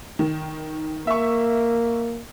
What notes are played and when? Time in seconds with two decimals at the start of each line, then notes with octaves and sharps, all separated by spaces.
0.19 D#3
1.07 A#3 E5 C#6